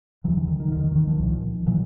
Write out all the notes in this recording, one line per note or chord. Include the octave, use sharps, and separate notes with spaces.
D#2 D3 E3 F#3
D3 E3
D#3
D#3
D#2 D3 D#3
D#3
D#3
D#3 F3
C2 A#2
A#2 E3 F#3